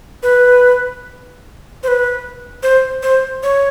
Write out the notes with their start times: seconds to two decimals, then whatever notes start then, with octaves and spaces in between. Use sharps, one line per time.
0.23 B4
1.83 C5
1.88 B4
2.63 C5
3.03 C5
3.43 C#5